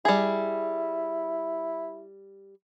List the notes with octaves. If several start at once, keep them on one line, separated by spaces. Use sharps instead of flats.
G3 E4 G#4